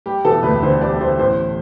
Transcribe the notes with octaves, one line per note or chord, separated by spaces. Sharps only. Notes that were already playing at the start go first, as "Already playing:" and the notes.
G3 G4
E1 A4
D2 B4
D3 C5
G3 D5
E1 C5
A1 C5